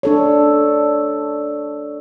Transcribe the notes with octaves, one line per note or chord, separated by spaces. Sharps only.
D4 A4 C#5